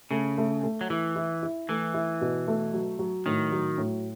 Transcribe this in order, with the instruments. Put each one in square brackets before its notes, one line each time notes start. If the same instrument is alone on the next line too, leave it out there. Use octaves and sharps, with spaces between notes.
[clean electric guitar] C#3 [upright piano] A3
[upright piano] A3
A3
[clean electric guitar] F#3
[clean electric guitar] E3 [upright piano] E4
[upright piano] E4
E4
[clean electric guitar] E3 [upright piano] A3
[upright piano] E4
B2
A3
F#3
F#3
[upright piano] A2 [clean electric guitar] D#3
[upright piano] F#3
A2